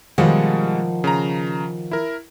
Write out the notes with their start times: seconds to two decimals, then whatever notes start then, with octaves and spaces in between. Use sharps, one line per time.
0.18 B2 D#3 F3 G3 G#3 F#5
1.04 C#3 A#5
1.91 E4 A#4